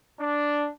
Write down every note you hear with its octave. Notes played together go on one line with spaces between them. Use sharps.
D4